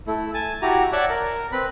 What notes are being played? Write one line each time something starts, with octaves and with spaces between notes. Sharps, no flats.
A3 E4
G#5 A5
E4 F#4 G4 A#5
C#5 D5 E5 F#5 A5
A#4
C4 B4 B5